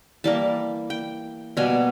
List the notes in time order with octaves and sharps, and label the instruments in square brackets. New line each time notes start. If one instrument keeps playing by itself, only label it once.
[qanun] E3 G3 A#3 A5
G5
B2 G3 A#3 G#5